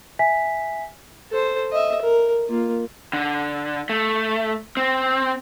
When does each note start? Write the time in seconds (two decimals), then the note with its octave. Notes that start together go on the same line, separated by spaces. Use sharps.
0.19 E5 G#5 B6
1.31 A4 C5
1.72 D#5 E5
2.02 A#4
2.48 A#3 F4
3.13 D3
3.89 A3
4.77 C4